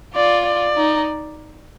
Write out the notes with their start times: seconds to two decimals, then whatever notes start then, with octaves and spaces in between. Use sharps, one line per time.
0.15 F4 D5
0.46 D5
0.77 D#4